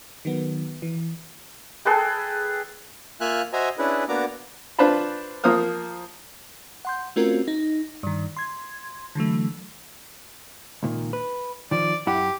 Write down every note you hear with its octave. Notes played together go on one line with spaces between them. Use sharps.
D#3 F#3 B3
E3
G#4 A4 B4 G5
A#3 F4 E5 G#5 F6 F#6
F#4 C5 D#5 E5 G#5 A#5
C#4 D4 E4 G#4 B4
A#3 B3 D4 F#4 A#5 D6
D4 F4 B4 C5 A5 B5
F3 A#3 C5 D#6 F6
F#5 C6 G6
A3 C4 C#4 F4 F#4 A#4
D#4
G2 D#3
C6 G#6
D3 E3 F#3 A3
C#2 A#2 D#3
B4
D#3 F3 D5
F#2 E4 G4 F#5